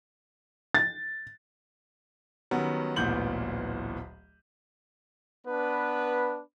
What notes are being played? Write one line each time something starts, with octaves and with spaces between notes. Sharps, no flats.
A6
D#3 F#3 G3 B3 C#4
D1 A1 A#2 B3 G6 F#7
B3 D4 B4